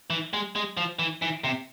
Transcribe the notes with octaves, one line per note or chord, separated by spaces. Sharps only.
E3
G#3
G#3
F3
E3
E3
C3